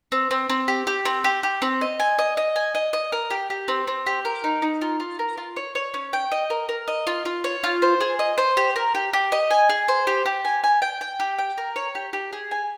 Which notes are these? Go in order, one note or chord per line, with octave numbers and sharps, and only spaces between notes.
C4
C4
C4
G4
G4
C4
G4
G4
C4
D#5
G#5
D#5
D#5
G#5
D#5
D#5
A#4
G4
G4
C4
C4
G4
A#4
D#4
D#4
F4
F4
A#4
F4
C#5
C#5
C#4
G5
D#5
A#4
A#4
D#5
F4
F4
C#5
F4
C5
G#4
D#5
C5
G4
A#4
G4
G4
D#5
G#5
G#4
C5
G4
G4
G#5
G#5
G5
G5
G4
G5
A#4
C#5
G4
G4
G#4
G#5